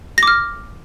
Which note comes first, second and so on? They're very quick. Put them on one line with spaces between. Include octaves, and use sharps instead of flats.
A#6 D6 F6